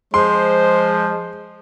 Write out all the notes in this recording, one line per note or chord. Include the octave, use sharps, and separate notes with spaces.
F3 G#3 C5 C6